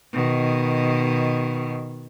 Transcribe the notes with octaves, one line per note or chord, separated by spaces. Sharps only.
B2 D#3